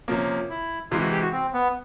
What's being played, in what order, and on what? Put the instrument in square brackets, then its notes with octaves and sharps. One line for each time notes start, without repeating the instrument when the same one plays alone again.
[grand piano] C3 F3 A#3 C#4
[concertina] E4
[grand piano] C3 E3 G#3 [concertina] F4
[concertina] F#4
G4
F#4
C4
B3